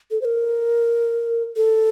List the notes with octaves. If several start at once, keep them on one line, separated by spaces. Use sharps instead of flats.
A4
C5
A#4
A4